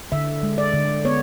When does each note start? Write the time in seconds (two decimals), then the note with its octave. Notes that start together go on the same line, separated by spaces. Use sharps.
0.12 D3 E5
0.43 G#3
0.58 D5
0.73 D3
1.05 B3 C#5